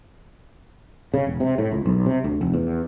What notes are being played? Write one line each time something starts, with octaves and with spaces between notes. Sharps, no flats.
C#3
E1
C3
A2
C#2
B1
C3
D2
F1
E2